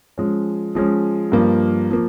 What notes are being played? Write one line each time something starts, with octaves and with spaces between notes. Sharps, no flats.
F3 G#3 C#4
F3 G#3 C#4
G2 F3 A#3
F3 A#3